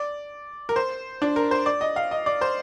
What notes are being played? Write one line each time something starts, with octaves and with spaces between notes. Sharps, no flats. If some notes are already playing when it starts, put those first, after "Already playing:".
Already playing: D5
A#4
C5
D4
A#4
C5
D5
D#5
F5
D#5
D5
C5